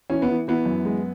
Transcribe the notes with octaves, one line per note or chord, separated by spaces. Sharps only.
E3 C#4
B3
E3
E3 B3
F#2
G#3